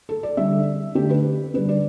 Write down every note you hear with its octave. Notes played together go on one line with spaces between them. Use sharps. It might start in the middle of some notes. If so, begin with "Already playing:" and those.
A4
D5
D3 G3 E5
D3 A3 G4
B4
D3 G3 B4
D5